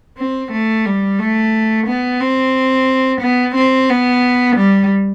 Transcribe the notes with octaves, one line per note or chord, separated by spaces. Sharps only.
C4
A3
G3
A3
B3
C4
B3
C4
B3
G3